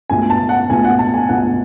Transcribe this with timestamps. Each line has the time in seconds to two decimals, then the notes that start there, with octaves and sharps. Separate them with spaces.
0.10 C#2 B2 A3 G#5
0.30 A5
0.49 F#5
0.70 C#2 B2 A3 G#5
0.85 F#5
0.99 A5
1.14 G#5
1.29 C#2 B2 A3 F#5